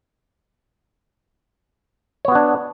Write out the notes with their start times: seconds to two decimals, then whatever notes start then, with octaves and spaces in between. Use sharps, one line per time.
2.25 C#5
2.28 B3
2.32 F#4
2.35 D4